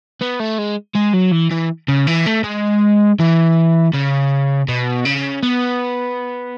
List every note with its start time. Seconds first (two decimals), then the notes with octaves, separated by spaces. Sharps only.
0.21 B3
0.40 A3
0.58 G#3
0.95 G#3
1.14 F#3
1.32 E3
1.51 E3
1.88 C#3
2.07 E3
2.26 A3
2.44 G#3
3.20 E3
3.94 C#3
4.68 B2
5.05 C#3
5.43 B3